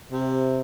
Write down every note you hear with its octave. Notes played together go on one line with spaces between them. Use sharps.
C3